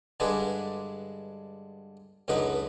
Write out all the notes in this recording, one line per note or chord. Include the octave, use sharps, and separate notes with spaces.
G2 D3 G#3 D4 B4 G#5
C#2 F#2 D3 D#4 B4 B5